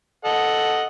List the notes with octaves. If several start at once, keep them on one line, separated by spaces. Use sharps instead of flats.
A4 D#5 F#5